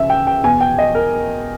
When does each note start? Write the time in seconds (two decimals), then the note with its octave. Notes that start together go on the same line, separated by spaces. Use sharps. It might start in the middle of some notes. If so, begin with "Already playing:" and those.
Already playing: C#2 C#3 E5
0.10 G5
0.27 G5
0.44 E2 B2 G#5
0.61 G5
0.78 D#5
0.95 A#4